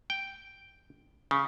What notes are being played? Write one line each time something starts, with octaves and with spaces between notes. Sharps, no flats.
G5
C#3